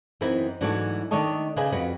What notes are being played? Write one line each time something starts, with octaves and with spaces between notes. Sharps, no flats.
F#2 E3 B3 C4 D#4 E4
G#2 E3 F#3 A3 D4 F#4
D#3 A3 D4 C#5 D#5 A5
C#3 D4 G#4 B4 D#5 G#5
F2 F#4 B4